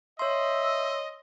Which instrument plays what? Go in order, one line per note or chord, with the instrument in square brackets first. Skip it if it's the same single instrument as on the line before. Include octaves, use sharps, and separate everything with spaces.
[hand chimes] C#5 C6 [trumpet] D#5 [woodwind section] E5 E6